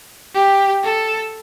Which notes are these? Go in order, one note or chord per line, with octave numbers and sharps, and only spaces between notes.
G4
A4